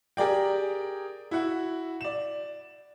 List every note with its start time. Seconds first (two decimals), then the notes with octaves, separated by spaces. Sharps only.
0.17 G4 G#4 A#4 D5 G5
1.31 E4 F#4 F#5
2.01 D5 E7